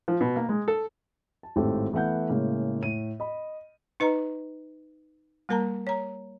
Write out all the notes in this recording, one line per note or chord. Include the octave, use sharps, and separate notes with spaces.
F3
B2
A#3
G#3
A4
A5
G#1 A2 C4 G4 A4
E3 A3 B3 F#5 G6
A2 C#3 G#3 A#3
A2 D#7
D#5 B5
D#4 B4 D#5 A#5
G3 A#3 A#4 A5 A#5
C#5 A#5